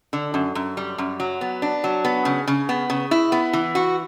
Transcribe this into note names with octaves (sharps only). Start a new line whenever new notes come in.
D3
F#2
F#2
G3
F#2
F#3
B3
D4
F#3
B3
C#3
C#3
B3
C#3
E4
B3
E3
F#4